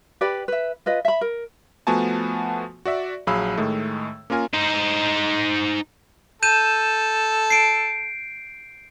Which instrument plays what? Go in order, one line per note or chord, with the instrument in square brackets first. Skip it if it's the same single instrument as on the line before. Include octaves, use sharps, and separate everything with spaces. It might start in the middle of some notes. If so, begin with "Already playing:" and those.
[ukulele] G4 B4 D5 B5
B4 E5
F4 B4 D#5
E5 B5
A#4
[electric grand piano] F3 A3 B3 F#4 G#5 A5
F#4 D5 E5
A#1 F#3 G#4 F5 B5 E6
A2 D#3 G#3 A3
A#3 C#4 F4 A#4 G#5
[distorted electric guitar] D#4 C5
[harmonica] A4 [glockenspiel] G6 D#7 E7
[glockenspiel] C7 D7